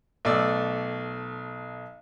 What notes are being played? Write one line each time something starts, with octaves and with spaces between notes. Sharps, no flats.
B1 A3 D5 E6